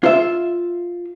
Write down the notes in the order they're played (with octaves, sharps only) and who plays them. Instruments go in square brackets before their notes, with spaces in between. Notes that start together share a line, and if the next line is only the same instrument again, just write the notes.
[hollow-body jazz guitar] F4 E5